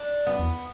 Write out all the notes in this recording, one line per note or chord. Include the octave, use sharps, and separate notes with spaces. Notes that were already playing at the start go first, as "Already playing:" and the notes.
Already playing: D4
F#2 B3
E2